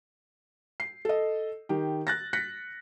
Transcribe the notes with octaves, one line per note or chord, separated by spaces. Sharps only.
C7
A4 D#5
D#3 G4
F#6 A6 A#6
F#6 A#6 B6 C#7